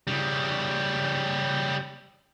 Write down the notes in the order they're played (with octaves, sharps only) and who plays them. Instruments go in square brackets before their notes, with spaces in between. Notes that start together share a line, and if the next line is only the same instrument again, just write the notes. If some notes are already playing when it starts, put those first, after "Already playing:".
[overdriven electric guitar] C#3 G3